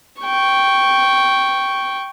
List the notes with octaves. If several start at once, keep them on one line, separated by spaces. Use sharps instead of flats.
G5 C#6